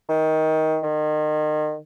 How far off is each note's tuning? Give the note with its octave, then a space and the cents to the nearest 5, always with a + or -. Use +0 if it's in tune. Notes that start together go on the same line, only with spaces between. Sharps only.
D#3 +20
D#3 -35